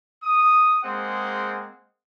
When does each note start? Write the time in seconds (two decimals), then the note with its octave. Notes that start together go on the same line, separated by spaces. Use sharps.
0.23 D#6
0.83 G#3 A#3 C4 G#4 F#5